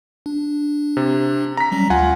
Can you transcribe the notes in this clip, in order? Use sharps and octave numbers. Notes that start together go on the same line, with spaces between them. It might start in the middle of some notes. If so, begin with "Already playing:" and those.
D4
C3
A#5 B6
F#3 G3 C#4
D2 F4 F#5 G#5